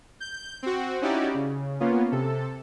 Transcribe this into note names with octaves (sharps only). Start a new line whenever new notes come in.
G6
C4 F#4
C#4 D#4 E4 F#4 G4 D5
C#3
A#3 B3 C#4 F4
C3 A4